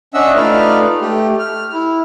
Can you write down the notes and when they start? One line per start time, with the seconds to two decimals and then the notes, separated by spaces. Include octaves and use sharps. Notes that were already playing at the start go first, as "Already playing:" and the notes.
0.14 C#4 D4 D#5 E5 F#5 E6
0.36 A3 D#4 F4 B4 D5 F6
1.01 A3 G4
1.39 F6
1.73 E4